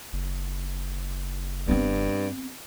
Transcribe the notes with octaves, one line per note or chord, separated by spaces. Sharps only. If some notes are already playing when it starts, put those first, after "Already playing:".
F#1
G2 B3 C4